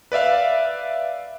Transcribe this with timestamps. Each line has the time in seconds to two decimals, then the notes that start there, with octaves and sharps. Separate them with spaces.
0.12 B4 D5 E5 F5